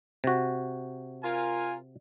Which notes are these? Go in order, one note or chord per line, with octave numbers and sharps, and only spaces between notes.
C3 F#4
F4 A#4 G#5